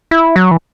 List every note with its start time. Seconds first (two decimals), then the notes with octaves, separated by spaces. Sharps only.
0.11 E4
0.36 F#3
0.51 E3